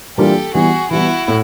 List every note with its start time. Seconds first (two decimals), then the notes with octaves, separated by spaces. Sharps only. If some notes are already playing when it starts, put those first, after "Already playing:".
0.17 E3 G3 A#3 D4 F4 G4 A4
0.54 E3 G3 B3 F#4 G#4
0.91 E3 G3 B3 E4 F#4
1.28 A2